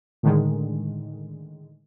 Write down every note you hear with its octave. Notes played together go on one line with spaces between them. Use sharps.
A2 D3 D#3 G#3